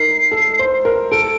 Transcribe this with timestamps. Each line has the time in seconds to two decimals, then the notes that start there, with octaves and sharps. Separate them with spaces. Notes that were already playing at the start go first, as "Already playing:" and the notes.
Already playing: D#4 A#4 C7
0.31 A4
0.59 C5
0.85 A#4
1.12 A4 D7